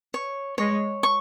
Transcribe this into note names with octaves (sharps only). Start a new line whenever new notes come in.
C#5
G#3 C#5
C#6